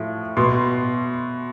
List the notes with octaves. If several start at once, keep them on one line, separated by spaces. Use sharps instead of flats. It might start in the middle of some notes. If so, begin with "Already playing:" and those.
Already playing: A2 F3
B2 C6